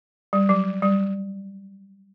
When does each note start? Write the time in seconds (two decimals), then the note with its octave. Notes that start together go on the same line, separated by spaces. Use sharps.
0.33 G3
0.49 F#3
0.82 G3